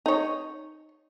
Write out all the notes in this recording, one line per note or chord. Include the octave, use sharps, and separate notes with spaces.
D#4 C#5